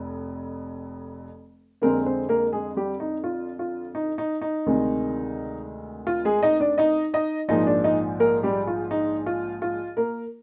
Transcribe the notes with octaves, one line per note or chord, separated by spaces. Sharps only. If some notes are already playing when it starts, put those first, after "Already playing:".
Already playing: F1 F2
F2 D3 G#3 A#3 C4 A#4
C4 C5
A#3 A#4
G#3 G#4
G3 G4
D#4
F4
F4
D#4
D#4
D#4
D2 C3 D#3 G#3
F4
G#3 G#4
D#4 D#5
D4 D5
D#4 D#5
D#4 D#5
A#1 G#2 F3 A#3 D#4 D#5
D4 D5
D#4 D#5
A#3 A#4
G3 G4
F4
D#4
F4
F4
A#3 A#4